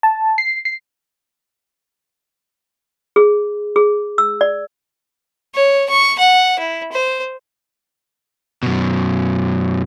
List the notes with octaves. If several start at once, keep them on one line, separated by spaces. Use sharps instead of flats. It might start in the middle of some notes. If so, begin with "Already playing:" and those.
A5
C7
C7
G#4
G#4
E6
D5
C#5
C#6
F#5
E4
C5
F#2 B2